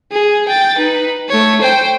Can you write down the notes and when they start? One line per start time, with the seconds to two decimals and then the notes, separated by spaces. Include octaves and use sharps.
0.11 G#4
0.48 G5 A6
0.78 D#4 B4
1.29 A3 C#5
1.61 C5 G5